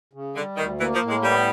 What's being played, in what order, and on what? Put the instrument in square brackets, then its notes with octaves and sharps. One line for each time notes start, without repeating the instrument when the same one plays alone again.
[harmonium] C#3
[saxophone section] D3 [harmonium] G3
[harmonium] D2 [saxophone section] D#3
[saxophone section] E3 [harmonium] A#3
[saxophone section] F3
[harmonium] A2
[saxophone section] G#3
[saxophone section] G3 [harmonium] B3